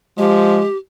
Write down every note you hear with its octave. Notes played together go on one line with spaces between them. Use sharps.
F3 G#3 G4